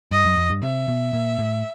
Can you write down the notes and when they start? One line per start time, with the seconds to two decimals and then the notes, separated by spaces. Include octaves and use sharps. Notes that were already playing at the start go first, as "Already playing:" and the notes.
0.11 G2 D#5
0.25 F#2
0.37 F2
0.50 G2
0.63 C3 E5
0.88 B2
1.13 A#2
1.39 A2